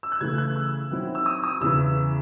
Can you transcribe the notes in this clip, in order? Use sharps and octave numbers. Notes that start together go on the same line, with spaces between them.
E6
F#6
C#3 E3 A3 G#6
F#6
E6
D#3 F#3 C4 E4
E6
D#6
D#6
E2 C#3 E3 E6